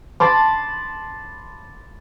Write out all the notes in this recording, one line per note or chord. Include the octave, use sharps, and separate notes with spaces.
A5 B5 C6 D6